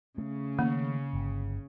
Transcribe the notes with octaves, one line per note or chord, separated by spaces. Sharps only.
C#3 A3
D#3 A3 A#3
G1